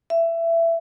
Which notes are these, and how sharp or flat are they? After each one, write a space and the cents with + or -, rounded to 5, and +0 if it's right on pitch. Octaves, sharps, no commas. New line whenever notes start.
E5 +20